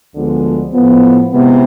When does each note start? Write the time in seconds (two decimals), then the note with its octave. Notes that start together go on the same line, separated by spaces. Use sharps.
0.15 D2 D3 F3 G#3 B3
0.72 A2 F3 B3
1.31 C3 E3 G#3 B3